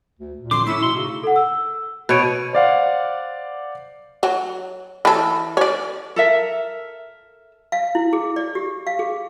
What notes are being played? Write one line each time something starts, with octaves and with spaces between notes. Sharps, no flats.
D2
A#2
F2 D3 C6 D6
A2 A3 C#4 E4 E6
B2 C6
C#3 D#4 F#4
A4 F#5
E6
B2 C#5 B5 D7 D#7
C5 D5 F5 F#5
F#3
E3 A4
C#5 D5
A4 A#4 E5
F5
E4
G#4
D5
G4
F5
G#4